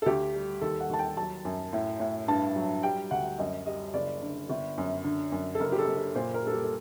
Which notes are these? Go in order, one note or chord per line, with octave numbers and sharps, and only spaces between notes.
A4
D2 G4
G3
D#2 A4
F#5
D#2 A5
G5
F#3 A5
F#2
A2
A2
G2 A5
F#3
G3 G5
D2 F#5
F#2 D#5
G3 D#5
F#1 D5
D3
G1
F#2
D3
F#2
A4
F#1 A#4
G4
A4
F#1
A4
A#2 C5
A#4
G3 A4
G4
A4